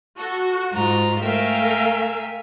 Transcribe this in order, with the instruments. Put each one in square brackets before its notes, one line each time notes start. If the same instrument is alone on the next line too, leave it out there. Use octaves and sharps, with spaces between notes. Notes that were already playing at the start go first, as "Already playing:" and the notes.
[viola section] F#4 [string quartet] A4
[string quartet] G#2 F4 A#5
[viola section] A3 A#4 F5 [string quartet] E5 G5 G#5